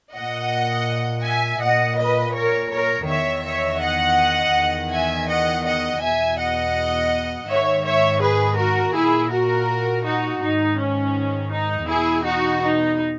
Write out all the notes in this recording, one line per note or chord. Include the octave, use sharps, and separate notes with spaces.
A#2 D#5 F#5
E5 G#5
A#2 D#5 F#5
B4 D#5
A#4 C#5
A#4 C#5
E2 D#3 C#5 E5
C#5 E5
D#5 F#5
E2 D#3
E5 G#5
D#5 F#5
D#5 F#5
E2 B2 E5 G#5
D#5 F#5
G#2 D#3 C#5 E5
C#5 E5
G#4 B4
F#4 A#4
A#2 E4 G#4
F#4 A#4
D#4 F#4
G#2 D#3 D#4
C#4
D#4
E2 B2 E4 G#4
D#4 F#4
D#4